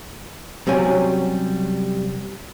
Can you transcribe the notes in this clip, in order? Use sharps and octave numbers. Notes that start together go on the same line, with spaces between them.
C3 F#3 G3 C#4 G#5